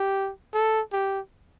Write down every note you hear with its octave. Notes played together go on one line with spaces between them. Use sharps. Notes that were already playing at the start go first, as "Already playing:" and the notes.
Already playing: G4
A4
G4